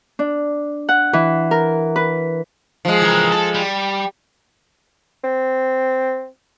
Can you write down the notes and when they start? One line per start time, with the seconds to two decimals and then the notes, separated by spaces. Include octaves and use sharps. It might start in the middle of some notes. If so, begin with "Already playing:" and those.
0.19 D4
0.89 F#5
1.13 E3
1.51 A#4
1.96 B4
2.85 F3 G#3
3.02 E3 A#4
3.32 A4 A5
3.54 G3
5.24 C4